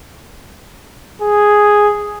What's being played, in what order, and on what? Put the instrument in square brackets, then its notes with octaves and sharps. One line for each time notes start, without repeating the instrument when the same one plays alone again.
[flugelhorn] G#4